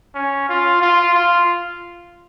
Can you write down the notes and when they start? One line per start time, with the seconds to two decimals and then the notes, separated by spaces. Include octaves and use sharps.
0.15 C#4
0.48 F4
0.82 F4
1.15 F4